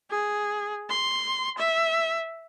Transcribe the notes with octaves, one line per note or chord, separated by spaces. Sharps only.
G#4
C6
E5